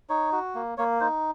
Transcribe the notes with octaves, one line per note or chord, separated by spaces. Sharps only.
D#4 C#5
F#4
A#3
A#3 C#5
D#4 C5